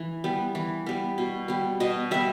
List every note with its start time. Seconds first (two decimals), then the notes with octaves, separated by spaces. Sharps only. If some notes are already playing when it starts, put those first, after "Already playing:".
Already playing: E3
0.24 G3 B3
0.55 E3
0.86 G3 B3
1.18 B2
1.48 G3 B3
1.80 B2 D#5
2.11 G3 B3 E5